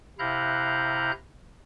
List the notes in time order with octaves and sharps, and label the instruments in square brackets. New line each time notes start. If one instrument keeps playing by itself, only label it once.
[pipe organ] C3 E4 F5 A#5 F#6 G6